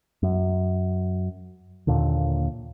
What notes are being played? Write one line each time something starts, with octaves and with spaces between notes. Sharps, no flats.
F#2
D#2 A#2 D3